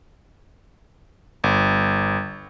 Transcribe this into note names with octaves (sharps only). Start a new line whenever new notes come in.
G1